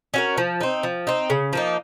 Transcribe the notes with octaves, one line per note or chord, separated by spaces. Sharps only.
C#4 F#4 A#4
F3
C4 D#4
F3
C4 D#4
C#3
F3 A#3 D#4